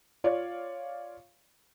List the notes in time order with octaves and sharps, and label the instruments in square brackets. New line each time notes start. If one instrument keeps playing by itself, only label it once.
[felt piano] F4 C#5 D5 F5